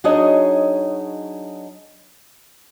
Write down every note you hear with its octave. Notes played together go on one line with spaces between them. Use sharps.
F#3 D4 D#4 G#4 C#5 D#5